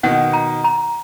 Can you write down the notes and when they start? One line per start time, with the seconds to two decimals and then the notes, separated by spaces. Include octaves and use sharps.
0.03 B2 D#3 F#5
0.33 A#5
0.64 A#5